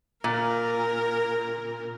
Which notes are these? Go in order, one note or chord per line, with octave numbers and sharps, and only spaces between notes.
A#2 A#4